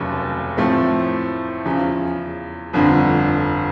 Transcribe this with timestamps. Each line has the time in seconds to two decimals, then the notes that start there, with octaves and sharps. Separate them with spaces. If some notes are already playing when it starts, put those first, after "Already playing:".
Already playing: F1 D#2 C#3 F#3 A3
0.57 A2 F3 A3 C4
1.65 E2 C#3 F3
2.73 G1 F2 D3